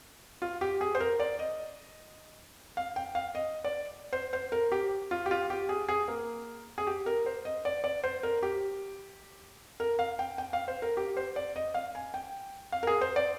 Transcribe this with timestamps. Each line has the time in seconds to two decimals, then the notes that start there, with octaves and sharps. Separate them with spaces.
0.42 F4
0.61 G4
0.81 G#4
0.95 C5
1.00 A#4
1.20 D5
1.39 D#5
2.77 F5
2.96 G5
3.15 F5
3.35 D#5
3.64 D5
4.13 C5
4.33 C5
4.52 A#4
4.72 G4
5.11 F4
5.26 G4
5.31 F4
5.50 G4
5.69 G#4
5.89 G#4
6.08 A#3
6.78 G#4
6.87 G4
7.06 A#4
7.26 C5
7.45 D#5
7.65 D5
7.84 D5
8.04 C5
8.23 A#4
8.43 G4
9.80 A#4
9.99 F5
10.19 G5
10.38 G5
10.53 F5
10.68 C5
10.82 A#4
10.97 G4
11.17 C5
11.36 D5
11.56 D#5
11.74 F5
11.95 G#5
12.14 G5
12.72 F5
12.83 A#4
12.87 G#4
13.01 C5
13.16 D5